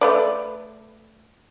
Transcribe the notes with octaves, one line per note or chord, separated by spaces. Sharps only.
A3 B4 D5